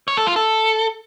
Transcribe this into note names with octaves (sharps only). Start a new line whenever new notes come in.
C#5
A4
F4
A4